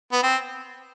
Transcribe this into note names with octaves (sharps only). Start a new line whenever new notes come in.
B3
C4